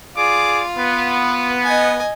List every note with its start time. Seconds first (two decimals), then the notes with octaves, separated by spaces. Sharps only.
0.17 F4 G#4 D5 D6
0.77 B3
1.62 D#5 G#5